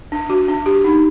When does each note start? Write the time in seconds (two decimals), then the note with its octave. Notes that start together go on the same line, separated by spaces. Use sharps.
0.12 D4
0.30 F#4
0.48 D4
0.66 G4
0.84 D#4